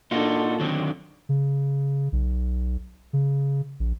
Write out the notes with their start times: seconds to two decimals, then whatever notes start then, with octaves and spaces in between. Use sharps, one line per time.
0.11 A#2 D4 D#4 F4 F#4 A4
0.60 D3 D#3 F#3 C4
1.29 C#3
2.12 B1
3.13 C#3
3.80 A#1